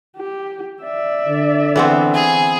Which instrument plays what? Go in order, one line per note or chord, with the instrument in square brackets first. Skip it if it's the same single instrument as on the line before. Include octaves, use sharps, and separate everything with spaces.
[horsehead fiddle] G4
D5 E5
[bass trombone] D3
[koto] E3 B3 C4
[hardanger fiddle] G#4